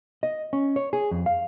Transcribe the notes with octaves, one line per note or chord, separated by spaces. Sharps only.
D#5
C#4
C#5
G#4
F2
F5